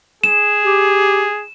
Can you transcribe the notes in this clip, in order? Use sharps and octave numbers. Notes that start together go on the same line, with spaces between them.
G#4 E7
G4